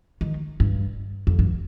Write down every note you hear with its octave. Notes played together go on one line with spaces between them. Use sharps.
D#3
G2
F2
G2